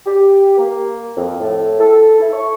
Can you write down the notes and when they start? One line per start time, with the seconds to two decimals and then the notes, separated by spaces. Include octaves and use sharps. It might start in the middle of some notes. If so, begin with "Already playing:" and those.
0.06 G4
0.58 A#3
1.17 F2
1.41 A2
1.80 A4
2.20 E4
2.33 C#6